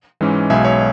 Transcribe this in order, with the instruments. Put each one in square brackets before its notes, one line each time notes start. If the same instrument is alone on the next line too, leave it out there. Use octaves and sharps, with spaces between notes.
[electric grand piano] G#2 E3 G#3 C#4
B1 B2 G#3 E5 G#5
C#5 E5